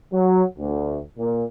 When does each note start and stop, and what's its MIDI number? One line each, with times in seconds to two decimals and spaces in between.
0.12 0.43 54
0.59 0.99 38
1.18 1.44 46